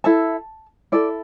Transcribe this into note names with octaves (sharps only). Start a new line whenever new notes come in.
E4 A4 A5
E4 A4 D5